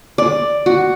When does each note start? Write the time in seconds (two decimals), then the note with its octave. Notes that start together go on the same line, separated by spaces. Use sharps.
0.18 D5
0.66 F#4